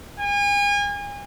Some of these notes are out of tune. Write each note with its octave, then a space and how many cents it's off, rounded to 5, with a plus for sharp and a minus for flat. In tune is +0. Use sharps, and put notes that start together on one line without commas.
G#5 -35